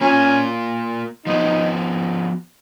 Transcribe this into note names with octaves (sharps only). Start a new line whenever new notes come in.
A#3 C#4 F4 A#4
F3 B3 D#4 F#4